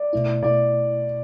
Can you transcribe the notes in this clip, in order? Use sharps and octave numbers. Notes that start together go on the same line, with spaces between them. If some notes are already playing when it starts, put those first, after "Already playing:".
Already playing: D5
B2 A3 E4
B2 A3 E4 D5